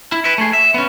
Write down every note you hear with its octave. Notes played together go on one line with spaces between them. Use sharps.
E4
E4 B4
A3 G#4
E5
B3 C#4